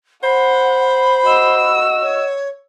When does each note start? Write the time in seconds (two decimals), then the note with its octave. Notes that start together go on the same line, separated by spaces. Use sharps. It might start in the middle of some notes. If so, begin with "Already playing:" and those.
0.23 C5 F#5 B5
1.24 F#4 D#5 E6
2.01 C#5